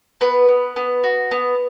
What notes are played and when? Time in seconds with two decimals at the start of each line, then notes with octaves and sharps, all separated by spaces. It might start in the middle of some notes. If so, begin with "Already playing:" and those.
0.21 B3 B4
0.48 B3
0.76 B3
1.04 F#4
1.31 B3